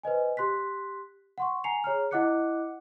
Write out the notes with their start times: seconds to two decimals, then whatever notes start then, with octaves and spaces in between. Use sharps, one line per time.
0.03 B4 C5 D#5 G#5
0.37 G4 C6 F#6 B6
1.38 F#5 C6 C#6
1.64 G#5 A#5 C7 C#7 F7
1.84 G#4 C#5 A#5 F6
2.11 E4 D#5 F#5 D6 F#6 C#7